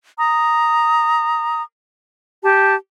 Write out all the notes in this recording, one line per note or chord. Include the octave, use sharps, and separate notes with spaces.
A#5 D#6
G4 A5